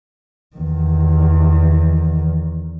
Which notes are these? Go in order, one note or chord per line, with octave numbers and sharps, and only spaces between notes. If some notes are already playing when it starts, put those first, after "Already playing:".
E2 D#3